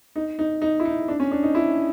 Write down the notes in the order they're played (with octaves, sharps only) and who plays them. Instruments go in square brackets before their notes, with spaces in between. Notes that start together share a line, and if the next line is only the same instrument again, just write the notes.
[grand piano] D#4
D#4
D#4
E4
D#4
D4
C#4
D4
D#4
E4